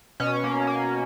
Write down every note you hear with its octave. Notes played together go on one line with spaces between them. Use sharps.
B2 C#4
A#3
A#3